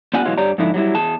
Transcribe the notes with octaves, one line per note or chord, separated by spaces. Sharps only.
B3 D4 F4 G4 F#5 G#5
B2 E3 F#3 G#3 F4
G2 G4 C#5 D5 A#5
G#2 D3 F3 D#4 E4
F#3 G3 E4
E2 G#4 A5